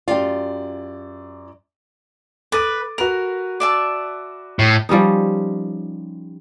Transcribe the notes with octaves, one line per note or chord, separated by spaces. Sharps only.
F#2 F4 G4 D5
A4 B4 D6 A6 D#7
F#4 A#4 B4 F7
D5 E5 A5
A2
F3 G3 C#4 D#4